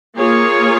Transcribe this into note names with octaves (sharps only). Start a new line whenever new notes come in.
A#3 F4 G#4 C#5